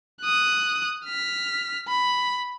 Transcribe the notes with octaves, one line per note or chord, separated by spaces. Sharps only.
D#6 F#6
F6 B6
B5